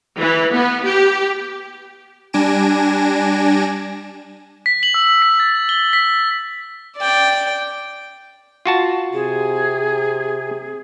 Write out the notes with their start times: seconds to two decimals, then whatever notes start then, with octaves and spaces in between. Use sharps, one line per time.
0.19 E3
0.54 B3
0.85 G4
2.33 G3 D4 G#5 A#6 D7 E7
4.66 B6
4.83 F#7
4.94 E6
5.22 B6
5.40 A6
5.69 G7
5.93 B6
6.97 D5 G5
8.66 F4 F#4 A5
9.14 C3 G#4